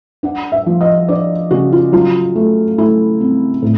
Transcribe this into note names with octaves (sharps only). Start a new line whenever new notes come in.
D4 F#5
E5
F3
D#5
D4 D5
C#3 F#4
F4
F#3 F4
A3
A3 E4
C4
A2